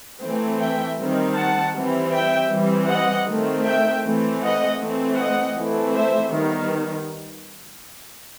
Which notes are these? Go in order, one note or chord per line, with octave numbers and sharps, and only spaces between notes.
E3 A3 C4
E5 G5
D#3 G3 C4
F#5 A5
E3 G3 C4
E5 G5
E3 G3 C4
D#5 F#5
D#3 A3 C4
E5 G5
E3 A3 C4
D#5 F#5
E3 A3 C4
D#5 F#5
E3 A3 C4
C5 E5
D#3 G3 B3